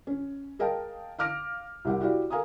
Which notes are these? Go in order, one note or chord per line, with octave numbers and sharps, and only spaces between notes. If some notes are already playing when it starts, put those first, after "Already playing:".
C#4
G#4 A#4 D#5 F5 G5 A5
F5 D6 F6 A#6 D7
C2 C3 G4 A#4 F#5
E4 F#4 G4 D5 F5
A4 A#4 F5 G#5 A#5 D#6